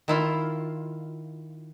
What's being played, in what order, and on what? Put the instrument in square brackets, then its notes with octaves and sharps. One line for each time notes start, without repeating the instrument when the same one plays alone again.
[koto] D#3 E4 F4